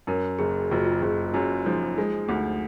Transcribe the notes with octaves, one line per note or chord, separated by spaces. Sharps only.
F#2 A#4
F#1 G#4
F#1 F4
F#4
F4
F#1 G#4
F#2 F#4
F3 D#4
G#3 D#4
D2 D#4